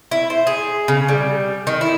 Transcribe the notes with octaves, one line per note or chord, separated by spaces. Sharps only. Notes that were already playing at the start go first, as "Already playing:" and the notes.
E4
C5
G#4
C#3
G3
D#3
E4